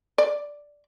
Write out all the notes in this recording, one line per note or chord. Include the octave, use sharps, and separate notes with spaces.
D5